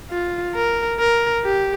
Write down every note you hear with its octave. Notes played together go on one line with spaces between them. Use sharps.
F4
A#4
A#4
G4